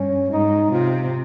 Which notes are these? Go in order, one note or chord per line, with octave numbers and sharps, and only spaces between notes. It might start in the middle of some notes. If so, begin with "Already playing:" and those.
Already playing: G2 C#4
G#2 D#4
C3 F4